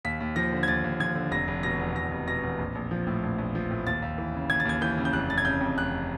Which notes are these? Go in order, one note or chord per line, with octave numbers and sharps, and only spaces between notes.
D#2 B6
D#2
F3 A#6
D3
G#6
D#2 A6
D#2
F3 G#6
D3
F1 A#6
F1
B2 A#6
E2
F1 A#6
F1
B2 A#6
E2
A#1
A#1
F3
A2
A#1
A#1
F3
A2
D#2 A6
D#2
E3
C#3
D#2 G#6
A6
D#2 G#6
E3 G6
C#3
G6
F1 F#6
F1 A6
G#6
C#3 G6
F2
F1 F#6